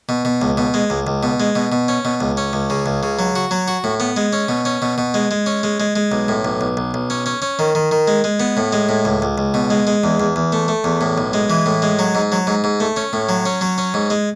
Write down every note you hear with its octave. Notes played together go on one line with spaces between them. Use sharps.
B2
B2
C#2
B2
G#3
C#2
C#2
B2
G#3
B2
B2
C#4
B2
C#2
C#4
C#2
C#3
C#2
C#3
F#3
F#4
F#3
F#4
A2
B3
G#3
C#4
B2
C#4
B2
B2
G#3
G#3
C#4
G#3
G#3
G#3
B1
A2
B1
B1
B1
B1
C#4
C#4
C#4
D#3
D#3
D#3
G#3
G#3
B3
A2
G#3
A2
C#2
C#2
C#2
B2
G#3
G#3
E2
E2
E2
A3
A3
E2
A2
B1
G#3
E3
A2
G#3
F#3
G#2
F#3
G#2
G#2
A3
C#4
A2
F#3
C#4
F#3
C#4
G#2
G#3